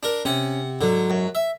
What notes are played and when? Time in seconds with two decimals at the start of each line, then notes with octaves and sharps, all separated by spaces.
0.03 D4 A#4
0.25 C3 C#4 F#5
0.81 G#2 D3 F#3
1.10 F#2
1.35 E5